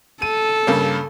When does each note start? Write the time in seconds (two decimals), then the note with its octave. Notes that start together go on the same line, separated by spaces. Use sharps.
0.22 A4 D#7
0.67 G2 C#3 A#3